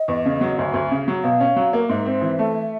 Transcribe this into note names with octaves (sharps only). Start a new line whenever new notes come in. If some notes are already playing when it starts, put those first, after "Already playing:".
Already playing: D#5
E2
C#3
F#3
D2
D2
C#3
F#3
B2 F5
C#4
F#3
A#3
G#2 E5
C4
E3
A3